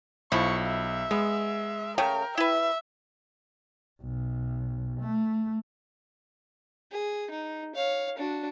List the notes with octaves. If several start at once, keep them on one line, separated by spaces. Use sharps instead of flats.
B1 F3 E4 C#6
E5
G#3 B3
C#3 A3 A#4 G5 C#6
E4 B4 E5
B1
A3
G#4
D#4
C#5 F5
D4 F#4